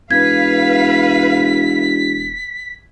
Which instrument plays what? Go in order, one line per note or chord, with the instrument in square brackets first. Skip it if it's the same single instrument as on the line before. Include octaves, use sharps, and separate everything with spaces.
[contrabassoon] E1 [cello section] B4 F5 [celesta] G#6 [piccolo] B6